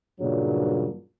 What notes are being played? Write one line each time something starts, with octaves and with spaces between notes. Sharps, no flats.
G2 A#2 C#3 E3 F#3 D4